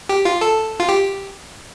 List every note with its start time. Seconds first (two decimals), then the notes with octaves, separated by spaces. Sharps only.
0.09 G4
0.25 F4
0.41 A4
0.80 F4
0.89 G4